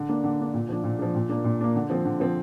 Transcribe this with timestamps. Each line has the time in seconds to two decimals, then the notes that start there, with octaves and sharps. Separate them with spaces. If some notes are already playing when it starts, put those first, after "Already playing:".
Already playing: D3
0.09 A#3 D4
0.24 D3
0.39 A#3 D4
0.54 A#2
0.69 F3 D4
0.84 A#2
0.99 F3 D4
1.15 A#2
1.29 A#3 D4
1.44 A#2
1.61 A#3 D4
1.76 D3
1.90 F3 C4
2.05 D3
2.20 F3 C4